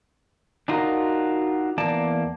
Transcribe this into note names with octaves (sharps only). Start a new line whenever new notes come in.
D4 D#4 F4 F#4 A#4
E2 A#3 D5 A5